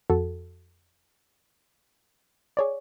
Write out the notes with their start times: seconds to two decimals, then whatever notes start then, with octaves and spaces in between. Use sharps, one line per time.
0.10 F2 F#4 A4
2.57 G#4 C#5 D5